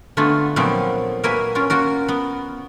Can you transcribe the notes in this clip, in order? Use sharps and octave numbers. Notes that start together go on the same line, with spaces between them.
D3 A3 B3 F4 F#4 G#5
A#2 F3 F#3 A3 B3 C4
A#3 F#4 A#4 B4 E5 G#5
C#4 F4 A#4
A#3 F4 F#4 A#4
B3